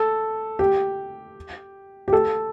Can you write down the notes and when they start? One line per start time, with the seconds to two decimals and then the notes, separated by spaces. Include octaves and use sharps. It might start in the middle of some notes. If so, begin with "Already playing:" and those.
Already playing: A4
0.59 G4
2.08 G4
2.13 A4